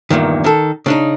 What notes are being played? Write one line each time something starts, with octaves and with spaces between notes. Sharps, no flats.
E2 G2 A#2 D#3
D#3 A4
C#3 D4 D#4